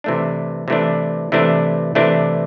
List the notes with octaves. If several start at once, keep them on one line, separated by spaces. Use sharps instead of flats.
C3 E3 A3 D4
C3 E3 A3 D4
C3 E3 A3 D4
C3 E3 A3 D4